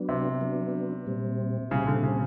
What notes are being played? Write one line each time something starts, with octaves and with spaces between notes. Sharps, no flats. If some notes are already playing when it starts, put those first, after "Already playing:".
Already playing: F#3 B3 D4
C3
F#3 B3 D4
A#2 G3 C4
A#2 C#3 G3 C4
D3
C#3